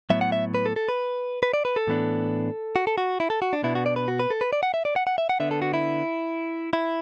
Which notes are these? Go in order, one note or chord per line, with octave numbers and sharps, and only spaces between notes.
A2 F#3 B3 E5
F#5
E5
B4
A4
A4
B4
B4
D5
B4
A4
A2 E3 B3 D4
F#4
A4
F#4
E4
A4
F#4
D4
B2 B3 D4 E4
F#4
D5
B4
F#4
B4
A4
B4
D5
F#5
E5
D5
F#5
F#5
E5
F#5
D3 B3 D4 E5
A4
F#4
E4
E4